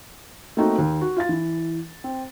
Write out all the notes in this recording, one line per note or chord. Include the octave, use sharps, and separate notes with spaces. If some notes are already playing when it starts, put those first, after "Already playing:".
A3 A#3 C4 D#4 F#4
D#2
F#4
F4 F5 A6
E3
C4